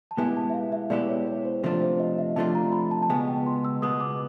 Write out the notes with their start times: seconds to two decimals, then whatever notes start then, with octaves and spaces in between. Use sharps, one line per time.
0.11 A5
0.17 B2 G#3 B3 E4 G4 G#5
0.36 A5
0.50 E5
0.54 F5
0.72 E5
0.90 B2 G#3 B3 E4 G4 D5
1.09 C#5
1.27 C#5
1.45 C5
1.63 C3 F3 A3 D4 F4 C5
1.82 C5
2.00 D#5
2.18 E5
2.36 C3 F3 A3 D4 F4 A5
2.55 A#5
2.73 B5
2.91 A5
3.03 A5
3.09 C#2 B2 G#3 B3 G#5
3.28 G5
3.46 C6
3.65 E6
3.82 C#2 B2 G#3 B3 D#6
4.00 D6